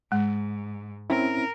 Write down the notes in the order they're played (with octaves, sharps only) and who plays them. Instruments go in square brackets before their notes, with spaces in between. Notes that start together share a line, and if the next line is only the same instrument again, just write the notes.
[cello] G#2 [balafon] G#3
[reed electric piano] C4 C#4 E4 [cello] A#4